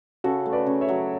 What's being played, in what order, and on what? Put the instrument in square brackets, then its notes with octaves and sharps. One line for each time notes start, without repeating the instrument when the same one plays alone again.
[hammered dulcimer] C#3 [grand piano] F#4 A4
[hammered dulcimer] A3
[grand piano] B4 D5
[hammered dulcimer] C#3
[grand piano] C#5 E5
[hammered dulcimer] F#3